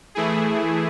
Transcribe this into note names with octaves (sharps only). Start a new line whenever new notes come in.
E3 A3 E4 G#4